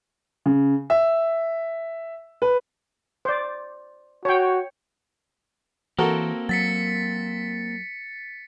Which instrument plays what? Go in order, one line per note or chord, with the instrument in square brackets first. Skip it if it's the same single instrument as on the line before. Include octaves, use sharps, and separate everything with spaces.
[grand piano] C#3
E5
B4
[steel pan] C5 D5
[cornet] F#4 [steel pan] C#5 G5
[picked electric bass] E3 [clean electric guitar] A#3 C4 [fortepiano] F#4 A4 A#4
[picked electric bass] F#3 [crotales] A6 B6 C#7